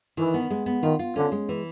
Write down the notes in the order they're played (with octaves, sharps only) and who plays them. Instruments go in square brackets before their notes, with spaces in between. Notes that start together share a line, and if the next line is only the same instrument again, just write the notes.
[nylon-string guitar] D#3 [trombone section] E3
[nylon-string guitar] B3
G#3
B3
[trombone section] D#3 [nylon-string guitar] F4
[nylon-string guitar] F4
[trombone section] D3 [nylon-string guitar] C#4
[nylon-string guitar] G#3
E3